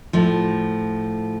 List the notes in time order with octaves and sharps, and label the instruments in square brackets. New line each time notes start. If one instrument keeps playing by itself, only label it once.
[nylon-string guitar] A2 F3